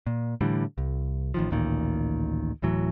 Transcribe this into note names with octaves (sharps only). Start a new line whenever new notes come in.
A#2
A2 D3 E3 G3
C2
A1 D#3 F3
A1 D2 A#2 D#3
D1 A2 E3 F#3